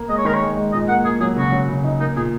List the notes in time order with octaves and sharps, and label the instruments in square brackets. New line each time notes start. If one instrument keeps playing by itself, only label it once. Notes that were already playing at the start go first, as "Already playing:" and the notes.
Already playing: [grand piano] A#3
[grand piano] G#3 [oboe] D#5
[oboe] C#5
[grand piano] D#3 [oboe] A#4
[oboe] C#5
[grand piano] G#3
G#3
[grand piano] A#2 [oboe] D#5
[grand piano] A#3 [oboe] F#5
[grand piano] A#3 [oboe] G#4
[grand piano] F#3 [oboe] G#4
[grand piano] C#3 [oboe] F#4
[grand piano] F#3
C#3
D#4
[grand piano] A#3 [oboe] D#4
[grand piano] A#2 [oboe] G#4